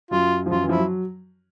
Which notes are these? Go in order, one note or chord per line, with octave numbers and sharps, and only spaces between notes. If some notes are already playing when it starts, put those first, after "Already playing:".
F#2 F#3 F4
F3
F#2 F#3 F4
E3
F3 E4
F#3